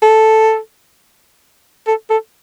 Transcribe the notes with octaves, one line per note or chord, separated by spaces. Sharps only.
A4
A4
A4